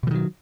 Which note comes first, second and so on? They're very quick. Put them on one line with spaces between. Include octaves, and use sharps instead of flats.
B2 E3 D#3 F#3